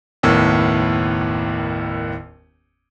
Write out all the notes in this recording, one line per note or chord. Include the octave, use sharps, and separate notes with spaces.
F#1 D#2 A2 B3